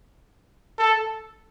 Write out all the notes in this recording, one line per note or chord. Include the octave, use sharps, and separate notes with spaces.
A4